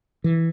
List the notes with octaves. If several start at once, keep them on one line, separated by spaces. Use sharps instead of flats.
E3